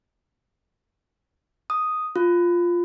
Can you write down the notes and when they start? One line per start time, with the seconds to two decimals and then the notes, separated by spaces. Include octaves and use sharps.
1.70 D#6
2.16 F4